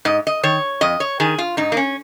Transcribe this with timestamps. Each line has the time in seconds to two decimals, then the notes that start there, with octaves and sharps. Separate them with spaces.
0.05 G#2 D#5
0.27 D#5
0.43 D#3 C#5
0.81 F2 D#5
1.00 C#5
1.20 D#3 G#4
1.38 F4
1.57 G#2 D#4
1.72 A#3
1.77 C#4